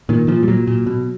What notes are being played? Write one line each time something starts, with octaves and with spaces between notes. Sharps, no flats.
A#2 D#3
A#2 F3
G3
A#2 F#3
A#2
B2